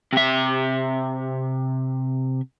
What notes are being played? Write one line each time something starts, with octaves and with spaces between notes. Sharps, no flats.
C3 E5